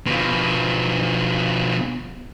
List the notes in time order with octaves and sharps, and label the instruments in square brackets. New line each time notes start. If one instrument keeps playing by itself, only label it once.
[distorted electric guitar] B2 F3